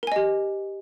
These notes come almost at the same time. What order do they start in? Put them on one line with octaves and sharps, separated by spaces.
A#4 G#5 D#5 G4